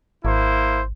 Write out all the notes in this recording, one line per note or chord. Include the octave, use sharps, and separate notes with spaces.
G#1 A#3 E4 C5